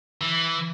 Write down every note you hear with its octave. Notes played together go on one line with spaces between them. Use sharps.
E3